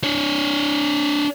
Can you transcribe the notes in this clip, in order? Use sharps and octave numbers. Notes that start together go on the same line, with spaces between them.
D4 C#5